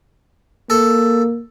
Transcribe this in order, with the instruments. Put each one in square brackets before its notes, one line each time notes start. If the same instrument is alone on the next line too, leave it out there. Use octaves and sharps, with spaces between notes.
[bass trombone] A#3 [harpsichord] A4